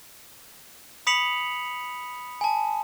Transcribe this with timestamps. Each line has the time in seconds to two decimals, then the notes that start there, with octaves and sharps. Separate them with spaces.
1.07 B5 D#6 B6 C#7 F7 F#7
2.41 G#5 A5